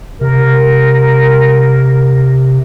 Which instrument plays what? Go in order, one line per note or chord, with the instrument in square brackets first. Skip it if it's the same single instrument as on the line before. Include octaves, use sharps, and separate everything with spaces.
[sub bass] C3 [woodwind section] A#4